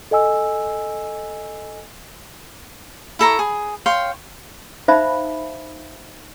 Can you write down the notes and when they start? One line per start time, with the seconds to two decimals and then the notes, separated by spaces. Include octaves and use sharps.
0.11 A4 D#5 G#5 E6
3.19 E4 A4 A#5 C#6
3.39 G#4
3.86 C#5 F5 G5 C6
4.88 D#4 C5 E5 F5 A5 B5